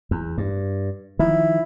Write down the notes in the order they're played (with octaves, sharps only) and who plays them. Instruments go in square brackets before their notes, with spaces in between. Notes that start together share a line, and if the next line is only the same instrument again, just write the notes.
[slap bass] E2
G2
[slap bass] D#3 F3 [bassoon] E4